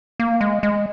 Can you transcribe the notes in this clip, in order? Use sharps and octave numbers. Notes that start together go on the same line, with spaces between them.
A#3
G#3
G#3